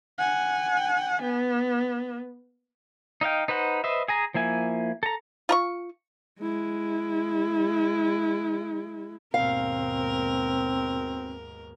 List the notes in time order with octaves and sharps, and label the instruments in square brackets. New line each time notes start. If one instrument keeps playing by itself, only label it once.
[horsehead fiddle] F#5 G#5
B3
[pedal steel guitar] D#4 D#5 F5 G5
D#4 B4 C5 F#5
B4 C5 D#5 E5
G#4 G#5 A#5
F3 A#3 E4 G#5
A4 A#5
[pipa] F4 A#5 C#6
[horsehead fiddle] G#3 E4
[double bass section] D#2 G#2 B2 [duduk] C4 [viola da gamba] A#4 [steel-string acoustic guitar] F5